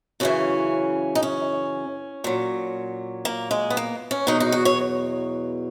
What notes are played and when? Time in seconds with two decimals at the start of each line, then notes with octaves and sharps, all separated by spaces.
0.20 F#2 C#3 E3 C#4
1.15 D#4
1.23 C#4
2.24 A#2 F#3
3.25 A#3
3.51 G#3
3.70 B3
3.77 A#3
4.11 C#4
4.27 E2 B2 F#3 D#4
4.40 D#4
4.52 F#4
4.65 C#5